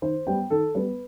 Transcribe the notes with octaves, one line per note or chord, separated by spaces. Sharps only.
D#3 C5
G3 B3 G5
D#3 A4
G3 B3 B4